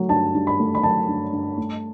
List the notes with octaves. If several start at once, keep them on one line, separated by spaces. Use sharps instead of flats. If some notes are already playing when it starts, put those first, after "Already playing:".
Already playing: F#3 A3
G2 A5
G2
B5
A3
B5
F#3 A5
G2
G2
A3